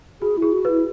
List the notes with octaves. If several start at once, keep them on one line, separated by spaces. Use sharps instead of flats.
F#4 G#4
E4 G#4
F#4
B4
E4